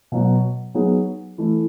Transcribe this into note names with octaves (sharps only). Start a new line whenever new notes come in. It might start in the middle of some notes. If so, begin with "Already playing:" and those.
B2 F#3 B3
F#3 B3 D#4 G#4
E3 A3 E4